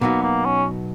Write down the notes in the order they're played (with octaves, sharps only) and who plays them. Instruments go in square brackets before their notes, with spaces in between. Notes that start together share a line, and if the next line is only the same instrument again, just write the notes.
[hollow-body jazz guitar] B2 F#3 B3 D#4 [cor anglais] A#3
[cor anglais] A#3
C#4